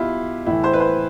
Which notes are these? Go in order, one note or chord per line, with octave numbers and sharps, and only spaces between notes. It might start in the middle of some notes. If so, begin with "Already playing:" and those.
Already playing: B2 E4 F4 G4
A2 E3 E4
C5
B4
C5